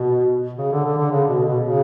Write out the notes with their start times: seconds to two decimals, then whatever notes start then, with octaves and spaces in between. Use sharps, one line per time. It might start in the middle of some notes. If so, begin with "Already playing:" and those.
Already playing: B2
0.58 C#3
0.72 D3
0.85 D3
0.98 D3
1.11 C#3
1.28 B2
1.45 B2
1.63 C#3